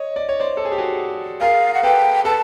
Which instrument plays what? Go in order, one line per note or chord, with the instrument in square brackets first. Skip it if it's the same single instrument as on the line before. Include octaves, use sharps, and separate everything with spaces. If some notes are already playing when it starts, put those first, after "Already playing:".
Already playing: [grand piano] C#5 D#5
D5
C#5
C5 D5
A4
G#4
G4
F#4 G#4
[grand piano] G#4 A#4 [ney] F5
[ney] F#5
[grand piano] A4 B4 [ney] G5
[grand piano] A4 B4 [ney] A5